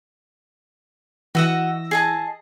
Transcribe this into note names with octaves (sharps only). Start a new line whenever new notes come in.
E3 F#4 D#5 F#5 E6 A#6
G#4 D#5 A5